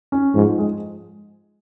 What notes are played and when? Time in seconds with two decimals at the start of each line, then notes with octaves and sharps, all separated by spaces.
0.12 C#4
0.35 G#2 F3
0.59 G#3